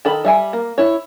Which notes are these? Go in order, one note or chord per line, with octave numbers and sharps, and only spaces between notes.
D#3 A4 B5
G3 E5 G#5
A#3
E4 C#5